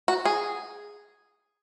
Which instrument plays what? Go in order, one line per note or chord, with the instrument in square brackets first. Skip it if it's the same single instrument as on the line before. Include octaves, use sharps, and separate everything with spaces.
[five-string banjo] F#4
G#4